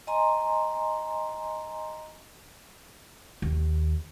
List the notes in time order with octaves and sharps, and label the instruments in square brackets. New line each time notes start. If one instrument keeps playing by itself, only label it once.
[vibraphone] D#5 G#5 A#5 C6
[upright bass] D#2